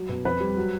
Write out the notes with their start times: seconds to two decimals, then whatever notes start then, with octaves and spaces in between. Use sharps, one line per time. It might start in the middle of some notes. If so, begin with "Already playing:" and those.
Already playing: F#3
0.09 B2
0.25 F2 B4
0.40 G3
0.57 F#3